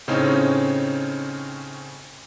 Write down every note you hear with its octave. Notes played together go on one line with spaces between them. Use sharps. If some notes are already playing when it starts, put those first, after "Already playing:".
A2 C#3 C4 C#4 D#4